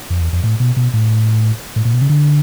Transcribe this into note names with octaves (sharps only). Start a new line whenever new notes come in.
F2
E2
F2
A2
B2
B2
A2
A2
A#2
B2
C#3
D3